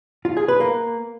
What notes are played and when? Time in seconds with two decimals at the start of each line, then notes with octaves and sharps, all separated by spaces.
0.25 F4
0.37 G#4
0.48 B4
0.60 A#3